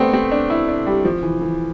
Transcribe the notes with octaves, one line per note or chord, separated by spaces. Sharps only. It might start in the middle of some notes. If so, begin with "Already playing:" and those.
Already playing: A3 B3 C4 D4
C4
D4
E4
D4
G3
F3
E3
E3